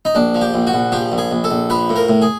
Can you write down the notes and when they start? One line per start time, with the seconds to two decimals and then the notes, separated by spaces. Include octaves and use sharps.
0.05 D#4
0.15 A#1 D4
0.35 F3
0.41 G4
0.54 A#1
0.67 F#4
0.74 A#1
0.92 F3 G4
1.12 A#1
1.18 G#4
1.31 A#1
1.44 A4
1.51 A#1
1.70 F3 B4
1.89 A2
1.96 A#4
2.09 A2
2.22 G#4